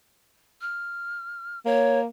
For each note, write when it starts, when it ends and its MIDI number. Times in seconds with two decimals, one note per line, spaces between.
0.61 1.59 89
1.66 2.06 58
1.66 2.00 73